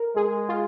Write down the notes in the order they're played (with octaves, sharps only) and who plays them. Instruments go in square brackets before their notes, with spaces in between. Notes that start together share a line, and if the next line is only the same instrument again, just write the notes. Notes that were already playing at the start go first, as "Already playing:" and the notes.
Already playing: [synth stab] A#4
[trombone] G#3 [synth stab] G#4
[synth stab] F4